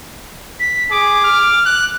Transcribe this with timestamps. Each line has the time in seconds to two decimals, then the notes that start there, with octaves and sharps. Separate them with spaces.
0.59 B6
0.90 G#4 D6
1.24 F6
1.65 F#6